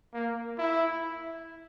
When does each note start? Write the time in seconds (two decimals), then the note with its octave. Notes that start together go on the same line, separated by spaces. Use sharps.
0.14 A#3
0.58 E4